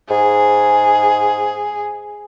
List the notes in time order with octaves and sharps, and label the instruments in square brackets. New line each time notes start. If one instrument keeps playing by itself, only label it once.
[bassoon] G#2 [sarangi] G#4